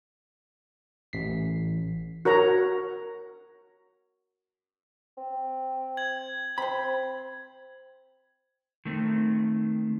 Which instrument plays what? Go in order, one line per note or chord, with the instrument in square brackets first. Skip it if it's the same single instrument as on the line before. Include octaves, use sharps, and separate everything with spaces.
[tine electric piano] A1 B6 C7
[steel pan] F#4 A#4 C#5 A#5
[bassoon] C4
[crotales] G#6 F#7
[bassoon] C4 [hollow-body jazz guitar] C5 B5
[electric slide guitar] D#3 A3 C4